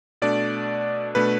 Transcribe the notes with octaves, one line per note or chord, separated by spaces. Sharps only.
B2 A3 D4 D5
B2 A3 D4 B4